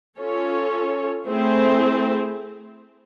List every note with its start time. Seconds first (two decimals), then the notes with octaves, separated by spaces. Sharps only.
0.19 C#4 F4 A4 C#5
1.27 A3 C4 E4 G#4 C5